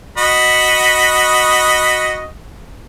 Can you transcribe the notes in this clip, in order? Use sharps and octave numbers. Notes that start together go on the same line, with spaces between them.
F#4 D#5 B5